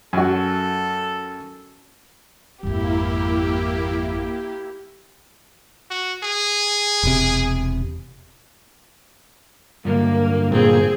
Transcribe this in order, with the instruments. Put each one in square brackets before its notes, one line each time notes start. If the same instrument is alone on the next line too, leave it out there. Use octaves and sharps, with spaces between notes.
[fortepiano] F#2 F#4 [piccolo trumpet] A4
[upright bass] G#1 F2 [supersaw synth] A#3 E4 [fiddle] G4
[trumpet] F#4
G#4
[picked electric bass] E1 C3
[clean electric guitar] G2 D3 F#3 [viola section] A#3
[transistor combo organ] A#2 [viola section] C4 G#4